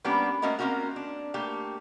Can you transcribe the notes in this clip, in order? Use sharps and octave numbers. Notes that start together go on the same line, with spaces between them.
G3 A#3 B3 C#4 D4 G4
A3 A#3 C#4 F#4 A#4 D#5
A#3 C4 C#4 F#4 A#4
D4
A3 A#3 G4